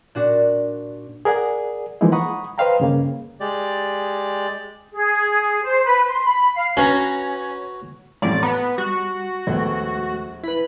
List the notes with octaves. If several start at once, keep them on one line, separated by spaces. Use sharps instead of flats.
A#2 D4 F#4
G#4 A#4 D5 F#5
E3 F3 G#3 A#3 D#4 E4
F#5 A#5 B5 C#6 D#6
B4 C5 D#5 F5 G5 A#5
G2 C#3 A#3
G#3 G4 D5
G#4
C5
B4
C6
B5
F5
C#4 F#4 B4 A#5
A1 F2 A2 D5
B3 A#5
G3 F#4
A#1 D#2 G#3 A3 B3
E4 B4 B5